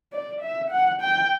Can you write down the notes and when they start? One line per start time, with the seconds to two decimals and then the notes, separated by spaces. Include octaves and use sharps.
0.13 D5
0.41 E5
0.71 F#5
1.01 G5